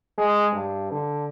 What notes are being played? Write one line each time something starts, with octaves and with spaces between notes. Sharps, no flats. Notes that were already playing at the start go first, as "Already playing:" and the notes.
G#3
G2
D3